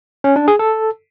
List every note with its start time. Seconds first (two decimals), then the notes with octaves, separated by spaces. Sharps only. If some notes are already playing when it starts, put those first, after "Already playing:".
0.24 C#4
0.36 D4
0.48 G#4
0.59 A4